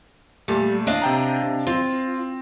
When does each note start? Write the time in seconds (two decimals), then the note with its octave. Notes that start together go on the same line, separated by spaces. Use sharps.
0.48 A#2 G3 A3
0.87 D4 D#5 F5
1.02 C3 G5 A#5
1.43 C3
1.67 C4 F4